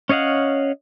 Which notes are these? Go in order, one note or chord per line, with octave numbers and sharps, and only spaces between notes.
C#4 C#5 D#5 F5 F#5